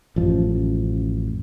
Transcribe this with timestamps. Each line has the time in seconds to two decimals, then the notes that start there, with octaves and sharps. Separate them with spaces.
0.16 A1 F#2 F3